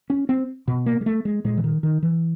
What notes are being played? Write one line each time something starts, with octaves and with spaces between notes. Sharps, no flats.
C#4
C4
B2
A#3
G#3
A3
G#3
A#2 G#3
E3
D#3
D#3
E3